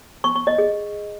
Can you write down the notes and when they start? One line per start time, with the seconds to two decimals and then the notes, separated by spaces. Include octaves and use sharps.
0.24 C#6
0.36 C#6
0.47 D#5
0.58 G#4